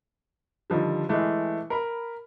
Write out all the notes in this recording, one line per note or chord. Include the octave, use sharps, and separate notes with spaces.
D3 D#3 F3 G3
E3 G#3 A3
A#4 B5